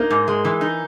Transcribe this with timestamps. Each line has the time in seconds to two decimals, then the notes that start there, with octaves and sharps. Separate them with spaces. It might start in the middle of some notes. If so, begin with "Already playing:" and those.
Already playing: A#3 D#4
0.10 G#2
0.28 G#3
0.45 E3
0.61 D#4